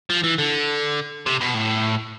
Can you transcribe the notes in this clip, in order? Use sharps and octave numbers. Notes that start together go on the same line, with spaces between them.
F3
E3
D3
C3
B2
A2